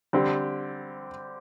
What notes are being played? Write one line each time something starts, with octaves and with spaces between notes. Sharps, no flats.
D3 G3 C4 G4